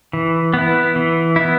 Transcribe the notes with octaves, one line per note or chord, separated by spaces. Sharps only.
E3
B3 E4
E3
B3 E4